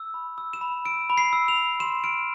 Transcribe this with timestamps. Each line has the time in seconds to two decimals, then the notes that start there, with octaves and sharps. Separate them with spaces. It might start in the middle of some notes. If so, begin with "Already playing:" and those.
Already playing: E6
0.14 B5
0.38 E6
0.53 E7
0.61 B5
0.85 E6 D7
1.10 B5
1.18 C7
1.33 E6
1.48 F7
1.56 B5
1.80 C6 E7
2.04 F6 D7